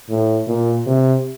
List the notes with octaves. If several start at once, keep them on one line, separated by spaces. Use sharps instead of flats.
A2
A#2
C3